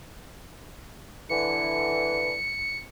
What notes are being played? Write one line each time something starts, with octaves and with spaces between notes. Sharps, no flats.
D3 E3 C#7